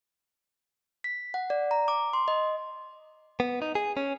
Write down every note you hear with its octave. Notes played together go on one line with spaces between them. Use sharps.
B6
F#5
D5
A#5
D6
C6
D#5
B3
D#4
G#4
C#4